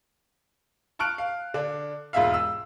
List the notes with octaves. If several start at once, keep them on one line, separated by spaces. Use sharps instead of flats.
A5 C#6 F6 F#6 D7
F5
D3 D4
E1 G#2 F4 E5 F5
E6